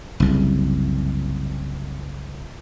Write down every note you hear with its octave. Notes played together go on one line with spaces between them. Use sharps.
F#1 C2